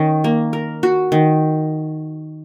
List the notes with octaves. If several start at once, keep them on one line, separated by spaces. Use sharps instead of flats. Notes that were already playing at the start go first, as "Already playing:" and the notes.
Already playing: D#3 C#4
A#3
A#4
F#4
D#3